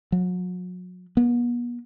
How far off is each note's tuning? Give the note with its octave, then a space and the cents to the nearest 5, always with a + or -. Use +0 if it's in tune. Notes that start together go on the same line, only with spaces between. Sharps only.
F#3 -35
B3 -40